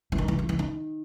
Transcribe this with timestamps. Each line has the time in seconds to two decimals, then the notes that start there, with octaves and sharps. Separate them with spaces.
0.12 E3
0.18 D#3
0.28 E3
0.39 F3
0.49 E3
0.59 D#3